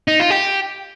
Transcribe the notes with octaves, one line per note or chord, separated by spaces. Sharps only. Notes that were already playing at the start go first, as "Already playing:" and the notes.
D#4
F4
G4